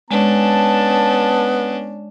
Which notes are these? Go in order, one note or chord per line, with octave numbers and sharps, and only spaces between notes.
G#3 B3 C#4 D4 A5